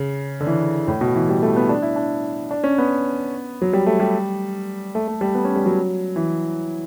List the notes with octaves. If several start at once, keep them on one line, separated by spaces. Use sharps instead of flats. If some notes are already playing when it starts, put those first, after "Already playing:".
Already playing: C#3
D3
E3
A2
B2
E3
G3
A3
B3
D4
E4
D4
D4
C#4
B3
F#3
G3
A3
G3
A3
A3
G3
B3
C#4
G3
F#3
E3